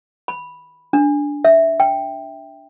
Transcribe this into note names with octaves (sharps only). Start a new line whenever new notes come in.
B5
D4
E5
G5